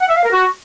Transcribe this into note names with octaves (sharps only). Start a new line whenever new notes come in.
F#5
E5
F5
A#4
F#4